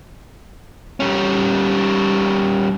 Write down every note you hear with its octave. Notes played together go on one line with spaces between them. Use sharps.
G3 C#4